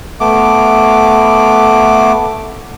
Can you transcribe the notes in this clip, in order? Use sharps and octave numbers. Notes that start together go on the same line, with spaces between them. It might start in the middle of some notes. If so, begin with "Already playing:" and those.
A3 B3 D6